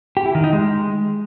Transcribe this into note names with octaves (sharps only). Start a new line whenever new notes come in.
G4
E4
D#3
D#4
G#3